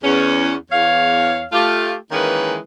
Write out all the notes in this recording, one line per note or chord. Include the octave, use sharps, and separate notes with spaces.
E2 C#4
E2 C#5 F5
A3 F4 G4
D#3 E3 G#3 A#3 C#4 B4